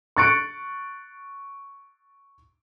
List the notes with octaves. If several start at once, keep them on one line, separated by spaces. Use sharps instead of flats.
C#6 F#6 A6 C#7 D7